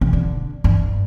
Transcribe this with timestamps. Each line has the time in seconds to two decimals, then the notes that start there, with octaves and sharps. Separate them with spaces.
0.01 C3
0.13 D3
0.64 G2